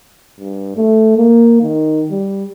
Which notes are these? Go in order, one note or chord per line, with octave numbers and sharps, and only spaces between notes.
G2
A3
A#3
D#3
G3